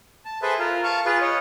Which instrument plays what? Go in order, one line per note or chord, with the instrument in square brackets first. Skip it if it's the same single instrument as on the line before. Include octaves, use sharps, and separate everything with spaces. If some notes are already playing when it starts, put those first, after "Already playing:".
[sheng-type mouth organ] A5
G#4 A4 B4 C5 E5
F4 A#4
F5 A5 C#6
F4 G#4 B4
C#5 D#5